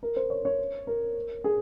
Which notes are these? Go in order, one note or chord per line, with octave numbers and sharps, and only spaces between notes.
A#4
C5
C#5
C#5
A#4
G#4